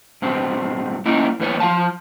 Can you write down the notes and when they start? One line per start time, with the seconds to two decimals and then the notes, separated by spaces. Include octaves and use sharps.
0.22 G2 B2 C4
1.06 A#3 C#4 D#4 E4
1.40 E2 A#3 B3 C#5
1.60 F3 G3 F5 A5